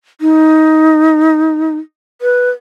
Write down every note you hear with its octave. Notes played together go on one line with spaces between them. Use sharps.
D#4
B4